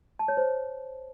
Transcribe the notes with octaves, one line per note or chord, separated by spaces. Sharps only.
A5
C#5
C5